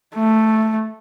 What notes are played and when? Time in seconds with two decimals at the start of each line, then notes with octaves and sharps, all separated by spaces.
0.15 A3